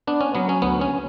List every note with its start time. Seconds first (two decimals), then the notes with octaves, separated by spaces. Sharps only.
0.07 B3 D4
0.21 C#4
0.35 F#3 B3
0.49 C#4
0.62 D2 B3
0.81 C#4